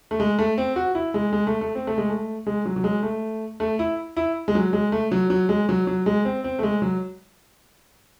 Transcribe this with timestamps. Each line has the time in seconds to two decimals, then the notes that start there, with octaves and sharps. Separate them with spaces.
0.11 A3
0.20 G#3
0.39 A3
0.58 C4
0.76 F#4
0.95 E4
1.14 G#3
1.33 G#3
1.47 A3
1.61 A3
1.75 C4
1.87 A3
1.98 G#3
2.09 A3
2.47 G#3
2.66 F#3
2.76 F#3
2.84 G#3
3.03 A3
3.60 A3
3.79 E4
4.17 E4
4.48 G#3
4.55 F#3
4.73 G#3
4.92 A3
5.12 F#3
5.30 F#3
5.49 G#3
5.69 F#3
5.87 F#3
6.06 G#3
6.25 C4
6.44 C4
6.59 A3
6.63 G#3
6.82 F#3